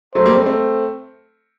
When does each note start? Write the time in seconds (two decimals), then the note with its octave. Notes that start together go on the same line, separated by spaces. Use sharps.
0.15 F#3 A3 C5
0.26 G3 A#3
0.36 A3 C4
0.46 A3 C4